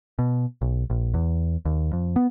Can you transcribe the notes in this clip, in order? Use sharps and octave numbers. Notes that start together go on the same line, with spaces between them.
B2
B1
A#1
E2
D#2
F2
B3